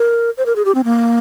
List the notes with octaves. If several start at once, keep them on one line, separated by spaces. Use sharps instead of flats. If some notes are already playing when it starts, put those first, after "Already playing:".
Already playing: A#4
C5
A#4
G#4
G4
C4
A#3